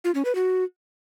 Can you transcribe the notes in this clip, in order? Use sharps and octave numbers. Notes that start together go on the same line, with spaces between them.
F4
C#4
B4
F#4